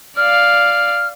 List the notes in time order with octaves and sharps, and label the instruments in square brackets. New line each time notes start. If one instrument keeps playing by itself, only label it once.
[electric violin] D5 F5 [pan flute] F6